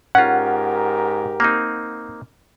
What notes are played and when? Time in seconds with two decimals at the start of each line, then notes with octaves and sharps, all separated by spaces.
0.15 G#2 C#4 F4 G4 A#4 F#5
1.40 A#3 C4 D#4